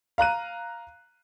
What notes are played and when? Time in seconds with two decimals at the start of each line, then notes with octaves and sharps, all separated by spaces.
0.18 F5 A#5 F#6 D#7